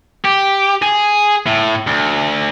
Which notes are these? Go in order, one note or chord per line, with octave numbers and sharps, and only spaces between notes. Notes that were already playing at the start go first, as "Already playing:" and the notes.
G4
G#4
A2
D2